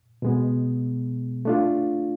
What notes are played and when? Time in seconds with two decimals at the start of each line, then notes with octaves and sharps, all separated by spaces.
0.22 B2 G#3 B3
1.45 A3 D4 F4